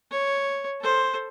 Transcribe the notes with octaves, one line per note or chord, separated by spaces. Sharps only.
C#5
A4 C5